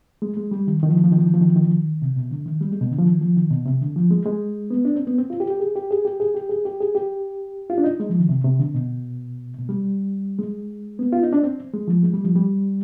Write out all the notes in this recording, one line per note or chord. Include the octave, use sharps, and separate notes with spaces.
G#3
G#3
G3
D#3
D#3
F3
D#3
F3
D#3
F3
D#3
F3
D#3
F3
D#3
F3
D#3
C3
B2
D3
D#3
G3
G#3
B2
D3
F3
D#3
F3
D#3
B2
C3
D3
F3
G#3
G#3
B3
D4
C4
B3
C4
F4
G4
G4
G#4
G4
G#4
G4
G#4
G4
G#4
G4
G#4
G4
F4
D4
D#4
G#3
F3
D#3
C3
C3
D3
B2
B2
G3
G#3
B3
F4
D#4
D4
C4
G#3
F3
G#3
G3
F3
G3